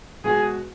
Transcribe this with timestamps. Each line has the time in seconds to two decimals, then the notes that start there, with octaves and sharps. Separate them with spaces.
0.24 B2 G#3 B3 F#4 G#4